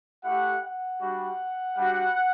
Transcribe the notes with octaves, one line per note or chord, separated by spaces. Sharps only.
A3 E4 G4 F#5
F#5
G3 D4 F#4
G3 D4 F#4 F#5